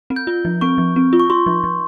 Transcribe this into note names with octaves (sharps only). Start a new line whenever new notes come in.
C4
G6
F4
F3
C4 C#6
F3
C4
F4
C#6
F4 C6
F3
F3